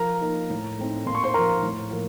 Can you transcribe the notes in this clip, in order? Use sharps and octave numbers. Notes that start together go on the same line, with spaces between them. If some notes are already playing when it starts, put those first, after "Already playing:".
Already playing: F3 A#4 A#5
A#3 D#4
A2
A3 C4 D#4
A#2 C6
C#6
C5 C6
F3 A#3 A#4 A#5
A2
F3 A#3